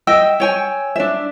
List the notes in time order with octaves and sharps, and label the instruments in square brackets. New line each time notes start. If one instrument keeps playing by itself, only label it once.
[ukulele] D#5 E5 G5 [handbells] E6
[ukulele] C#5 G5 G#5
D4 E5